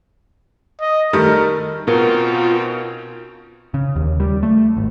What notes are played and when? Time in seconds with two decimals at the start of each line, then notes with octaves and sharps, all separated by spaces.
0.80 D#5
1.13 D#3 G3 A3 A#4
1.88 B2 C4 C#4 D#4 F4 A#4
3.74 C#3
3.96 D#2
4.20 G3
4.43 A3
4.77 G#1